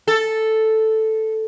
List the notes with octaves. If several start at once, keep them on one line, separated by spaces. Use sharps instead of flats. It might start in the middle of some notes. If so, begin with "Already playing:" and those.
A4